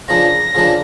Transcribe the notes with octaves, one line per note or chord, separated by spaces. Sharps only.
C#3 F3 A#3 D4 A#6
C#3 F3 A#3 D4